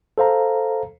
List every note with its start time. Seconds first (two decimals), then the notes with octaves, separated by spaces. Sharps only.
0.18 A4 C5 F5 A#5